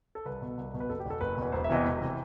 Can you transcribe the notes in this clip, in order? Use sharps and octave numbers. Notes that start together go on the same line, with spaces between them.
A4
C2 B4
B2
C2
B2
B4
F#1 A4
G4
E2 B2 A4
F#1 B4
E2 B2
E1 C5
E5
E2 C3 E3 D#5
E1
C3 E3